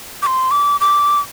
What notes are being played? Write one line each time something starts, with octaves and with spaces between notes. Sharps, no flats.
D6
C6
D6
D6